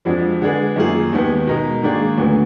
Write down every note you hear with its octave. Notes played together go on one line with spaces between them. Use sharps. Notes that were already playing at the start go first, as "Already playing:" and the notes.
F2 F3 G#3 D4 F#4
D3 G#3 D4 G#4 B4
F#2 D#3 A#3 F4 G#4
D#2 D#3 G#3 B3
B2 G#3 D#4 A#4
G#2 D#3 A#3 D4 G#4
D2 D3 F#3 B3